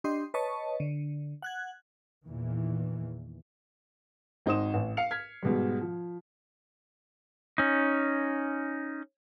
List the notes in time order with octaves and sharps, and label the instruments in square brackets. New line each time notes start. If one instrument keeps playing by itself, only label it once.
[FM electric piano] D4 G4 D#5 C6
B4 C#5 D#5 A5 C#6
D3
F#5 F#6 G#6
[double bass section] E2 A#2 D#3 E3
[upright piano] G#1 D#4 C5 D#6 E7
A1
F5 C7 C#7 F7
F6 G#6 B6
G#2 B2 G3
F3
[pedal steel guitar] C#4 D#4